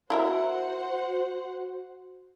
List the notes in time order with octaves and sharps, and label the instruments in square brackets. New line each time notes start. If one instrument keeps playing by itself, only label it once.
[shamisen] E4 A#4 E5 [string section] F#4 C5 F#5